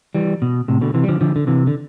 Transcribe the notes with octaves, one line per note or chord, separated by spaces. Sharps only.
E3 G3
B2
A2 C3
B2 D3
C3 E3
G3
D3 F3
D3 F3
D3
C3 E3
D3